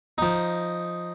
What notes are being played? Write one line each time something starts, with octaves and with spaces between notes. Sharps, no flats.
F3 D#4